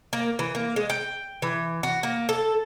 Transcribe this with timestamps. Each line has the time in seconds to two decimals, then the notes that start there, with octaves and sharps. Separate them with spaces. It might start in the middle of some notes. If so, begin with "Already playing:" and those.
0.13 A#3
0.39 E3
0.55 A#3
0.76 G#3
0.90 G5
1.42 E3
1.83 F#4
2.03 A#3
2.29 A4